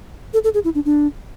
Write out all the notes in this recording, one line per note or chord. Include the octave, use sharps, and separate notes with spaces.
A4
A4
G#4
E4
D4
D4